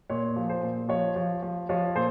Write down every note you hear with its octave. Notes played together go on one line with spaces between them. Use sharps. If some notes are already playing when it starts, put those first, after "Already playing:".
A#2 C#5
F3
C5
A#2
F3 C#5
F3
F3
F3 C#5
A#2 C5